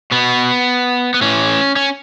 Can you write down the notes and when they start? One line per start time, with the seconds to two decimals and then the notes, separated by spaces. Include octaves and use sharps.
0.11 B2 B3
1.14 B3
1.21 A2 E3 C#4
1.76 C#4